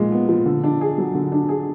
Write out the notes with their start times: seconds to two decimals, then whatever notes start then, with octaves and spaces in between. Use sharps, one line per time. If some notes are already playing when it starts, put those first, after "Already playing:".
Already playing: A#2 F3 G#3
0.12 B3
0.28 F3
0.46 D3
0.64 D4
0.81 G#4
0.98 F#3
1.14 D3
1.32 D4
1.49 G#4